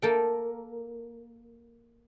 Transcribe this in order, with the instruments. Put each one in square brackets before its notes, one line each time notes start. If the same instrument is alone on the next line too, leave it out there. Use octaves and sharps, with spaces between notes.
[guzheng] A#3 A4 G5